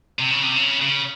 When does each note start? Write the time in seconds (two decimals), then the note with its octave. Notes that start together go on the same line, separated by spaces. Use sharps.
0.19 C3
0.31 C#3
0.43 C3
0.56 C#3
0.81 C#3